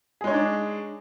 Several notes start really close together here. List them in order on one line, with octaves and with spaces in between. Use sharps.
G#4 G#3 C#5 D#4 D4